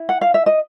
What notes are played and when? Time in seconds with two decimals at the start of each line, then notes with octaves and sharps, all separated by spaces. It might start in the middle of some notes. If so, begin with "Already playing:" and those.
Already playing: E4
0.09 F#5
0.21 F5
0.34 E5
0.46 D#5